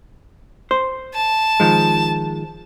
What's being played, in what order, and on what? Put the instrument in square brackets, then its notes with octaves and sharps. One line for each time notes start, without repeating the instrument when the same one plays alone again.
[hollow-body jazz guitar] C5
[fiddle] A5
[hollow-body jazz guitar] D#3 F3 G#3